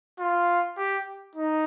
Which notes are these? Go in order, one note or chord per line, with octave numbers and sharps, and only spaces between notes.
F4
G4
D#4